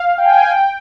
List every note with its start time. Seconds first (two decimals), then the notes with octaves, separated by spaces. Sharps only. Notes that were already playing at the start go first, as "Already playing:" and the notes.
Already playing: F5
0.18 G5
0.26 G#5
0.34 G5
0.43 G#5
0.51 G5